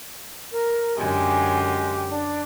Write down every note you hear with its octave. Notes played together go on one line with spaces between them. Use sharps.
A#4
F#2 D3 G#3 G4 G#5
D4